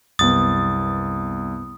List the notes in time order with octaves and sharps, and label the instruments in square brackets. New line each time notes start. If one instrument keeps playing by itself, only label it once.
[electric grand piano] C2 A6 [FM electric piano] F#2 B3 [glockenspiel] D#6